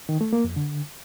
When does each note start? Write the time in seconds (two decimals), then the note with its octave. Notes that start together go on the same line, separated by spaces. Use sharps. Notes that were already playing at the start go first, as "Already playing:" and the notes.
0.09 D#3
0.21 A3
0.33 A#3
0.44 F2
0.56 D3